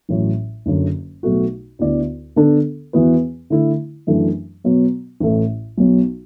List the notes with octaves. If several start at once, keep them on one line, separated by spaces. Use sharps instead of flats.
A1 A2 F#3
F#1 F#2 D3 F#3
B1 B2 A3 F#4
D2 D3 B3 E4 D5
D3 B3 D4 A4
E2 E3 B3 F#4 B4
D3 A3 E4
F#2 E3 A3 D4
B2 F#3 B3
A1 A2 A3
B1 B2 F#3